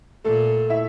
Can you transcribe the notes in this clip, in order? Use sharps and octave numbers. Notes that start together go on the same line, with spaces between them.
A#2 A3 A4
E4 E5